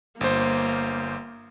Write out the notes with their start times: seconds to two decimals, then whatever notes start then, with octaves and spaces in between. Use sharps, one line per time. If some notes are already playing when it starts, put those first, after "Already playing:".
0.21 G1 A#3 C5